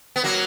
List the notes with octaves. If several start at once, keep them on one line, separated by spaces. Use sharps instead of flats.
B3
F#3 A#3